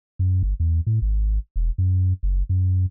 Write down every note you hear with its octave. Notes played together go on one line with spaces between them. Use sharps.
F#2
G1
E2
A2
G#1
E1
F#2
F#1
F#2